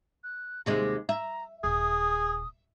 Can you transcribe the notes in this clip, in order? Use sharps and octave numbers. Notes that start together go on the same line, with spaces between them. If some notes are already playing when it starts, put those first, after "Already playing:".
F#6
D#2 C3 G#3 A#6
E5 A#5
D#1 G#4 D#6